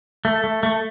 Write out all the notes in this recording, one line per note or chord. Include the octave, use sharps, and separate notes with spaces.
A3
A3
A3